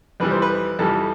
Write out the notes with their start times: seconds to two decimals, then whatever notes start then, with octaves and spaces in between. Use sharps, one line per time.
0.20 F2 E3 G3 B4
0.31 C5
0.42 B4
0.79 F2 E3 G3 A4